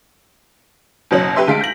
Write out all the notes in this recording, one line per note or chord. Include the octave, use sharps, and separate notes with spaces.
F#1 B2 F#3 C#4 F#7
G4 B4 E5 C6
D2 G#3 F5 B6 D7
G6 A#6 F#7